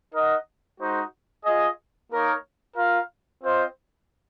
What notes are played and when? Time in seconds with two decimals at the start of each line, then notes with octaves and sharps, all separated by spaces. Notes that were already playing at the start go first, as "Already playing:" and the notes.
0.13 D#4 A#4 D#5 F#5
0.79 G#3 D#4 F#4 C5
1.44 F4 G#4 D#5
2.10 A#3 D#4 A#4 C#5
2.76 F4 A#4 F5
3.42 C4 F4 C5 D#5